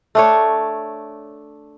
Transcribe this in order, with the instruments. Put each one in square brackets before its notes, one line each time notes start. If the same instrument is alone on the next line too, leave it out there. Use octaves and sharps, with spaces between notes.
[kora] A3 D4 C#5